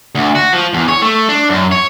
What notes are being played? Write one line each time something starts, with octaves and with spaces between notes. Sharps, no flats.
D2
F#4
F3
E2
C#5
A3
D4
F#2
C#5